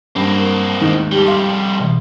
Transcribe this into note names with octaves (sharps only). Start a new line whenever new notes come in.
G2 A#3 C4
A#4
D#2 G#2 D#3
F2 G3 G4
F5 C6
B2 E3